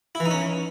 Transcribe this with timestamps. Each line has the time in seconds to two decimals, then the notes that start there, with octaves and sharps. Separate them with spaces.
0.15 E4
0.20 E3
0.26 D#4
0.31 C#4